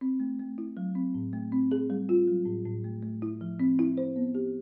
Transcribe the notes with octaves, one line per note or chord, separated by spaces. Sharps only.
C4
A3
A3
E4
F#3
C4
A2
A3
C4
G#4
G3
F4
F#3
A2
A2
A3
A3
E4
F3
C4
E4
C5
B3
G4